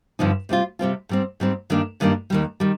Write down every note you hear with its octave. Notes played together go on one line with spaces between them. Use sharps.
G2 D3 F3 C4 D#4
C3 G3 C4 F4
C3 G3 C4 F4
G#2 G3 C4
G#2 G3 C4
G2 D#3 G3 A#3 D4
G2 D#3 G3 A#3 D4
D#2 D#3 G3
D#3 G3